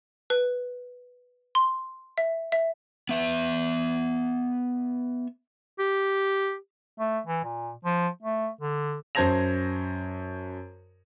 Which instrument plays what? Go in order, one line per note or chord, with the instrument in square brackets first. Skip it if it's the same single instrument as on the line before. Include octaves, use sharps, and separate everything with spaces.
[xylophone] B4
C6
E5
E5
[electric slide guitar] B3 E5
[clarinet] G4
[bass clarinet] A3
E3
A#2
F3
A3
D3
[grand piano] F#2 C5 A5 G#6 A#6 F7